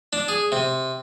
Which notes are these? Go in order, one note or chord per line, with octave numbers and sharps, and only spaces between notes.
D4
G#4
C3